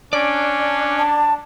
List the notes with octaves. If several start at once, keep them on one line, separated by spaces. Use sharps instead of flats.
C#4 D4 D5
A5